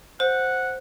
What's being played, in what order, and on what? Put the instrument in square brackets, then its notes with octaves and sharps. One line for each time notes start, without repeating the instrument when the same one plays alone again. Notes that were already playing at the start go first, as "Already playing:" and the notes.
[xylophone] C5 [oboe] F#5